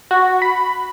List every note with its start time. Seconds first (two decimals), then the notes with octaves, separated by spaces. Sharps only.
0.11 F#4
0.42 B5